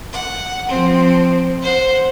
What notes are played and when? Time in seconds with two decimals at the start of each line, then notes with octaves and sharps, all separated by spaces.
0.11 F#5
0.69 F3 C4
1.63 C5 F#5